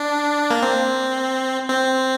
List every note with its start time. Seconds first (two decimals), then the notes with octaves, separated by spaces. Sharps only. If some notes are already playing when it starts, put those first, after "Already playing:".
Already playing: D4
0.51 A#3
0.62 C4
1.69 C4